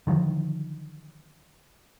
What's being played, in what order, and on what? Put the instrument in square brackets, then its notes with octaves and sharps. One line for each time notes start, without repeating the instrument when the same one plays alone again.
[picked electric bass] D3 D#3 F3 F#3